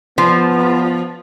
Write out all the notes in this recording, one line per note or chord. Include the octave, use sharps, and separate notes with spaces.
F3 B3